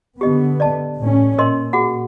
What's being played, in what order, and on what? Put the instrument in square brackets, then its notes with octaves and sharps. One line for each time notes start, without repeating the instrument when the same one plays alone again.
[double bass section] D3 B3 [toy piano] G4 D#5
[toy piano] D5 D#5 A5
[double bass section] A2 C#4
[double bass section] A#2 [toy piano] A#4 D#5 C6
[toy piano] F#4 G#4 F#5